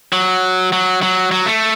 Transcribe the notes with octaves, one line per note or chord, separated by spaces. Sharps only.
F#3
F#3
F#3
F#3
A3